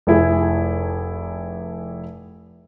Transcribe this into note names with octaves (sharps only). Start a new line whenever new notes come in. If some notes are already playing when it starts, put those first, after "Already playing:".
F1 E4 G#4